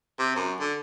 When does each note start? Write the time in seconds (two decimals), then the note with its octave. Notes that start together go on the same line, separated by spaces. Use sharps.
0.19 C3
0.36 F#2
0.60 D3